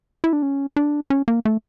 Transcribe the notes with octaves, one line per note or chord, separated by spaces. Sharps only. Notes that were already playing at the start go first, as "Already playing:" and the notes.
E4
D4
C#4
D4
C#4
A#3
A3